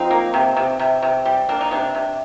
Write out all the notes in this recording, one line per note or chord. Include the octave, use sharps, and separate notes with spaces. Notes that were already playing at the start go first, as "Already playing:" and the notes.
Already playing: F3 C4 D#4
A#3
C3
C3
C3
C3
G3
A#3 D4
D#4
C3 D4
C3